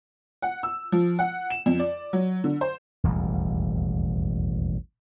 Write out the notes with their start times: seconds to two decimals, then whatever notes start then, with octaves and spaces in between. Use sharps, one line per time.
0.42 F#5
0.63 E6
0.92 F3
1.19 F#5
1.50 E7
1.66 F2
1.79 D5
2.13 F#3
2.44 D3
2.61 C5
3.04 E1 A1 D#2 G3